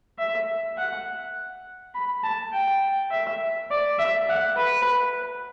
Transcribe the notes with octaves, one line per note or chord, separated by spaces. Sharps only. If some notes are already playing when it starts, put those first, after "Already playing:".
E5
F#5
B5
A5
G5
E5
D5
E5
F#5
B4